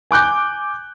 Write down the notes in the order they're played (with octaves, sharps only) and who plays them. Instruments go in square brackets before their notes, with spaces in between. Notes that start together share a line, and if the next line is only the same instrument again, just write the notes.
[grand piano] G#5 D6 F#6 G6